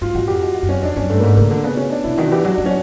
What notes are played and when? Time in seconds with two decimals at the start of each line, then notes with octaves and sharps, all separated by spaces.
0.01 G#2 F4
0.15 G#2 F#4
0.28 F2 G4
0.42 F#4
0.55 F#4
0.62 F#2
0.69 C#4
0.82 F2 D4
0.96 F#2 C#4
1.09 G2 A3
1.20 A#3
1.23 G#2 A3
1.37 C#3 A#3
1.50 D3 A#3
1.64 C#3 B3
1.77 C#4
1.90 D4
2.04 C3 E4
2.18 D#3 F#4
2.31 E3 G4
2.44 F#3 F#4
2.55 F#3 D4
2.66 C#4